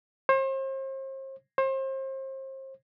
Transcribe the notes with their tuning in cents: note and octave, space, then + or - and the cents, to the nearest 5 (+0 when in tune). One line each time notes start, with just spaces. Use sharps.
C5 +40
C5 +35